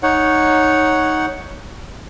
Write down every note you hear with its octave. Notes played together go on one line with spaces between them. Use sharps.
D#4 C#5 F#5